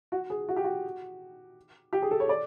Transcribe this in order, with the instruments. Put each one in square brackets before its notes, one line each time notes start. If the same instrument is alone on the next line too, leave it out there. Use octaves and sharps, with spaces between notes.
[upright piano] F#4
G#4
F#4
G4
F#4
G4
G#4
A4
C#5
D5